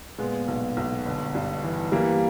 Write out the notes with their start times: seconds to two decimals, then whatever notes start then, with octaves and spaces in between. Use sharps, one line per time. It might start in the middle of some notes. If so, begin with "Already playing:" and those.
0.18 A#2 G#3 B3
0.48 B1
0.77 B1
1.06 G1
1.35 G2
1.63 E3
1.92 E3 G3 A#3